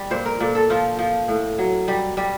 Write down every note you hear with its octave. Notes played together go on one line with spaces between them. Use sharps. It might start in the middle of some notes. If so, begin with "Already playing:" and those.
Already playing: G3
A#2 C5
A#4
A#2 A4
A4
F3 F4
F3
A2
F#3
G3
G3